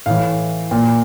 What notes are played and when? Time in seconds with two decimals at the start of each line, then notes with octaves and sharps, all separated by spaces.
0.06 A2 E3 F5
0.71 A#2